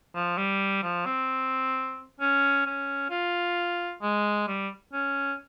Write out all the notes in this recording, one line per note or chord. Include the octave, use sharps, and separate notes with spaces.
F3
G3
F3
C4
C#4
C#4
F4
G#3
G3
C#4